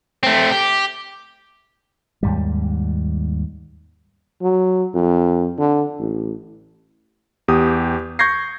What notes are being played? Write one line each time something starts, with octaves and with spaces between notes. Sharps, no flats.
A3 C4
G4
D#2 G#2 G3
F#3
F2
D3
A1
E2 G4 D#6
C#6 G6 G#6 A#6 C7